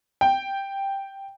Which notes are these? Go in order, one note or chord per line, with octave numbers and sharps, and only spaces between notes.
G5